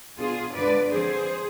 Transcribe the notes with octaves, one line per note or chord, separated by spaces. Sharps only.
B2 B3 D4 F4 G#4
G2 D3 G#3 D4 B4 D5
D3 F3 C4 G#4 C5